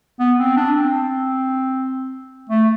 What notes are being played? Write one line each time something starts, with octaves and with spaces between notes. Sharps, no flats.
B3
C4
D4
C4
A3